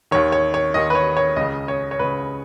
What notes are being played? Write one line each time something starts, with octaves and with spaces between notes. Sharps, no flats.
D#2 D#3 C#5
C#5
C#5
D#2 D#3 D#5
B4
C#5
C#5
C#2 C#3 D#5
C#5
C#5
C#2 C#3 B4